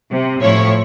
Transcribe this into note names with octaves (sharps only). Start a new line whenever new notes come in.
C3
A2 F3 E4 C#5